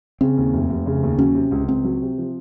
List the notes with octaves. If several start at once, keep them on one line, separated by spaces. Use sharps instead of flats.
C#3 C4
D#2
F1
F1
C#3
D#2
F#3 C#4
C3
C#2
C#2 C4
F#3
C3
F3